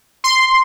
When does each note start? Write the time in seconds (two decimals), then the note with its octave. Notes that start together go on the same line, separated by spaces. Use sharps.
0.24 C6